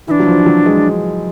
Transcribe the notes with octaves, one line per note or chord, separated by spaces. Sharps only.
E3 D4 E4
F#3
F3
F#3
G#3